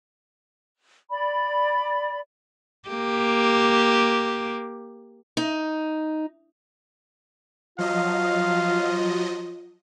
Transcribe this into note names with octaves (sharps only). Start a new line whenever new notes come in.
D5 B5
A#3 G4
D#4
F3 F#3 F4 D#5 F5